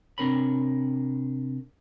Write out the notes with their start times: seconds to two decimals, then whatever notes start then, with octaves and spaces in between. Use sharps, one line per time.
0.18 C3 C4 D4 A#4 C#5 B5